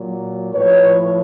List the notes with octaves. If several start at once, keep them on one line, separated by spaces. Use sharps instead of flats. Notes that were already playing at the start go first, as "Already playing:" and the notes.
Already playing: A#2 F#3
A2 F3 B4 C#5